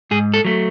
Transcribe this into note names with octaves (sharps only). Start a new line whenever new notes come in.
G#2 G#4
A4
F#3 A3